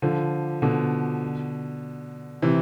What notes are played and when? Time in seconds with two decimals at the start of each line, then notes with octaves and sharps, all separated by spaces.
0.02 D3 F3
0.62 B2 D3
2.42 C3 E3